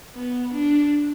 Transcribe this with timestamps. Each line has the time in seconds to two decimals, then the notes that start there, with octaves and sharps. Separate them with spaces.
0.15 B3
0.53 D4